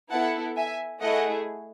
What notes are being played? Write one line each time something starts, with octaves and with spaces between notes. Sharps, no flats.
B3 E4 A4 F#5 A5
E5 G#5
A3 E4 G#4 D#5 F#5